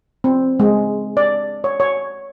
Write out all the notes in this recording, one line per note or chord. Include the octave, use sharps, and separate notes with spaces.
C4
G#3
D5
C#5
C#5